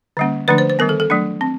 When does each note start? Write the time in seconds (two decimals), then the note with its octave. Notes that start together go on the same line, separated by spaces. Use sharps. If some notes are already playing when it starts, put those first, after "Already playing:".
0.17 D3 G3 A#3 C#4
0.48 D3 F3 A3 D4 B4
0.58 C5
0.70 C5
0.79 D#3 G3 B3 A#4
0.89 A4
1.00 A4
1.10 F#3 A3 D4
1.41 C4